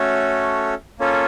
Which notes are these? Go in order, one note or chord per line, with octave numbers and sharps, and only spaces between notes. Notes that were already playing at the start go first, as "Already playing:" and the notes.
Already playing: A3 C#4 F#4 A4 C#5
A#3 C#4 F4 A4 C#5